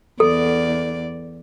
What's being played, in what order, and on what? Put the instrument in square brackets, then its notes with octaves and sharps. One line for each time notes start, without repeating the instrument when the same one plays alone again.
[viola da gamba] E2 D5 [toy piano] A4